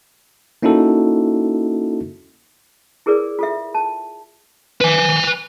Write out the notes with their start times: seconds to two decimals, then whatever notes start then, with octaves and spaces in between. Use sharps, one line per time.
0.62 A#3 C#4 D#4 E4 F#4 A4
3.06 E4 G#4 A#4 B4 D5
3.39 F4 A4 E5
3.75 A5
4.81 B4 G#5